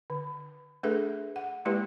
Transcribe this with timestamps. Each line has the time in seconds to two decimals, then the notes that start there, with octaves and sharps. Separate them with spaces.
0.10 D3
0.83 A3 D4 G#4 A4 B4 E5
1.36 F#5
1.65 G#3 A#3 E4 G4 B4